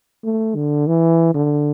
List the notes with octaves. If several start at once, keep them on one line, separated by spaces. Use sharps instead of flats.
A3
D3
E3
D3